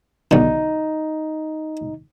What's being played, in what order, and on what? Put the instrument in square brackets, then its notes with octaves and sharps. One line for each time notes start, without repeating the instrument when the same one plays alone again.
[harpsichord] B1 D3 [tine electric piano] D#4